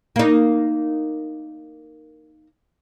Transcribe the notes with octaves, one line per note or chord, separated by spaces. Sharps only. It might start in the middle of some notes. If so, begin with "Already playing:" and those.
A#3 D#4